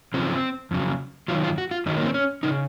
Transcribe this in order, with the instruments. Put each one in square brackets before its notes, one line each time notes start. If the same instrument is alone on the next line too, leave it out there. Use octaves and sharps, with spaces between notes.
[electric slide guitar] F#2 C#3 F3 C4
F2 C#3 F#3
F#2 D#3 F#3 F4
F4
F#4
F4
F#2 D#3 F#3 D#4
A#3
C4
C#4
C#3 D#4